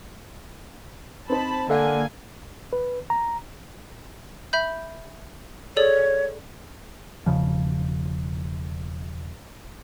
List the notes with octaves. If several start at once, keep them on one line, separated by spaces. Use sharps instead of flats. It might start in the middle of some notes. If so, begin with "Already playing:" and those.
C4 D#4 C5 A5 B5
D3 A#3 A4 F5 G#5
B4
A#5
E5 B5 G6
G#4 A4 C#5 D5
E1 C#3 F3